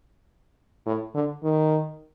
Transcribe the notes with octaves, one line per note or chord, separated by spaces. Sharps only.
A2
D3
D#3